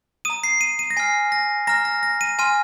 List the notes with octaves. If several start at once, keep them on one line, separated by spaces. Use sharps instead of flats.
A#5 D#6 D#7
C7
D#7
D#7
A#6
G#5 F6 C7
A#6
A#5 F6 A#6
A#6
A#6
D#7
G#5 C6 F6 D#7